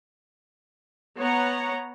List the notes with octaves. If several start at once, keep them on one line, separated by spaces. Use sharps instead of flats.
B3 C#5 F#5 A#5